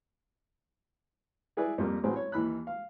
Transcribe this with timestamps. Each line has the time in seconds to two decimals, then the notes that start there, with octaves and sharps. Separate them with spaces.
1.57 E4 G#4 B4 D5
1.78 F2 G3 A#3
2.03 A1 F#3 A3 C4 G#4
2.16 C#5
2.32 D#2 E3 B5 F#6
2.67 F5